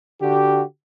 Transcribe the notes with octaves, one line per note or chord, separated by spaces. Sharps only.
D3 F#4 G4